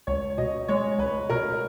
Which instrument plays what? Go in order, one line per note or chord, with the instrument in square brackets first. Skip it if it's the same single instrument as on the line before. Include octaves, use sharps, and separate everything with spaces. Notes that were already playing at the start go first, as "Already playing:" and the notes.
[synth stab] C#2 [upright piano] C#5
[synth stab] B2 [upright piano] D#5
[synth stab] G#3 [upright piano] C#5
[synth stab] C#2 [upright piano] B4
[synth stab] B2 [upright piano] A#4